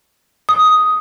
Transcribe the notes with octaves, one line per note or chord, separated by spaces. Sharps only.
D#6